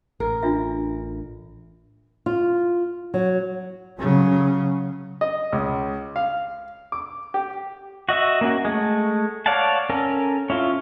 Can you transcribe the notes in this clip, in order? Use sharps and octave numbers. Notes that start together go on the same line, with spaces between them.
A1 A#4
D4 F4 E5
F4
F#3
C#3 F#3
D#5
C#2
F5
D6
G4
F#4 D#5 E5 C#6
A#3 C#4 F#4
G#3 A3
C#5 D5 F5 F#5 A5
C#4 A4 A#4
C#4 E4 F4